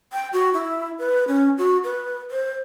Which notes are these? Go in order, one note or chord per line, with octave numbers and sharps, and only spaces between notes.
G5
F#4
E4
B4
C#4
F#4
B4
C5